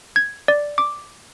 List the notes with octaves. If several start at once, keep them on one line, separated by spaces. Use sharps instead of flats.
G#6
D5
D6